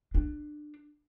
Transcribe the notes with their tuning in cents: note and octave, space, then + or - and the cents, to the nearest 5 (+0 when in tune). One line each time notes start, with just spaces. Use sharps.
D4 +25